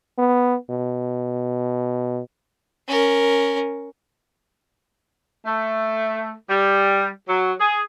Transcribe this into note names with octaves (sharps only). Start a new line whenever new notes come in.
B3
B2
C#4 A#4
A3
G3
F#3
G#4